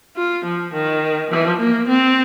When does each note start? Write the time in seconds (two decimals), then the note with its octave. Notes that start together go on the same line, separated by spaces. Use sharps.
0.16 F4
0.45 F3
0.73 D#3
1.31 F3
1.59 A#3
1.88 C4